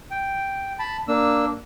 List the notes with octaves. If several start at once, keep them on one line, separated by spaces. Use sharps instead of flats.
G5
A5 B5
A#3 D4 E6